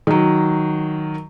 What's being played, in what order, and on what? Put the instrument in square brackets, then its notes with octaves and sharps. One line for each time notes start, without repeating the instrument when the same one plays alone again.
[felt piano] D#3 F#3